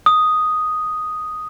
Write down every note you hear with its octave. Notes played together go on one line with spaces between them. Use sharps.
D#6